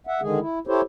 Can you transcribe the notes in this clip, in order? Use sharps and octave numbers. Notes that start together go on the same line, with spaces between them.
E5 F#5
D3 D#3 G#3 G#4
E4
E4 G4 A4 C5 C#5